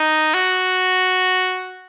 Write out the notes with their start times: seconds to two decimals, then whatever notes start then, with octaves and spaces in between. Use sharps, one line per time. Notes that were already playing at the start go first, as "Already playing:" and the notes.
Already playing: D#4
0.34 F#4